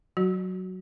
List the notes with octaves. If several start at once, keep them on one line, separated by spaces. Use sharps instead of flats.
F#3 F#4